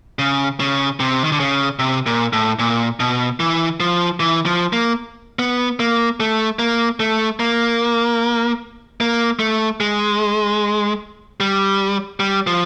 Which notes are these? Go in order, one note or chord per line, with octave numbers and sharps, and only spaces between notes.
C#3
C#3
C3
D#3
D3
C#3
C3
A#2
A2
A#2
B2
E3
F3
E3
F3
A#3
B3
A#3
A3
A#3
A3
A#3
A#3
A3
G#3
G3
G3
F3